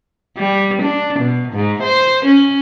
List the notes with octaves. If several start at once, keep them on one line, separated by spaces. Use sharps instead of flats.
G3
D4
B2
G#2
C5
C#4